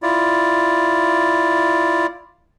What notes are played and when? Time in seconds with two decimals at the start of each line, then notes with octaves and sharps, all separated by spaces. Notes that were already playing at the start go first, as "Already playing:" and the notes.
0.03 E4 F4 D5